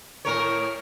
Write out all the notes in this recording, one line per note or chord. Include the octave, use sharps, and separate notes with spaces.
A2 A#4 C#5